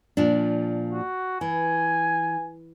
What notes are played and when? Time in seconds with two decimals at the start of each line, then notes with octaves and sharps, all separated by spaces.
0.17 A#2 F3 D4
0.93 F#4
1.41 E3 G#5